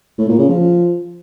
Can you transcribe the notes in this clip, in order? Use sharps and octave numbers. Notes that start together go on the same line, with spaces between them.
A2
A#2
C#3
F3